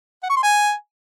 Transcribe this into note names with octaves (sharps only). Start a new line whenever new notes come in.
F#5
C#6
C6
G#5